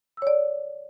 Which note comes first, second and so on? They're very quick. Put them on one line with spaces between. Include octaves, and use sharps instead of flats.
E6 C#5 D5